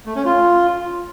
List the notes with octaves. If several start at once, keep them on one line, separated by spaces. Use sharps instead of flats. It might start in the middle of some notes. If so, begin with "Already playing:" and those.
A3
C#4
F4